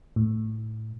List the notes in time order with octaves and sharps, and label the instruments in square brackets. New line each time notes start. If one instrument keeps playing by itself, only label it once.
[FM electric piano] A2